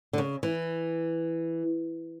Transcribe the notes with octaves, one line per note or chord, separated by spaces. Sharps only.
D3
C#3
E3